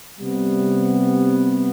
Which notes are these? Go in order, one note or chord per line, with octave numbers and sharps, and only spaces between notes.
C3 G3 B3